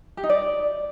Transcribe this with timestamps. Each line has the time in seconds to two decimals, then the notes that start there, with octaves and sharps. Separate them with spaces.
0.17 G4
0.23 D#4
0.30 D5